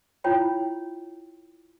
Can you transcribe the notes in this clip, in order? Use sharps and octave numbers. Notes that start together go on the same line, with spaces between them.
E4 F4 C#5 G5 B5